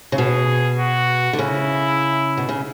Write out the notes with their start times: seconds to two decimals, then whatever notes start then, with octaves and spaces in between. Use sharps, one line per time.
0.12 C#3
0.17 B2 G#4
0.78 F#4
1.33 D3
1.39 C#3 E4
2.37 B2
2.49 C#3